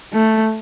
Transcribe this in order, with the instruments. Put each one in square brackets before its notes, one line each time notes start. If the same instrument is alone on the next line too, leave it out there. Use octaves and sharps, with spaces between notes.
[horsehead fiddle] A3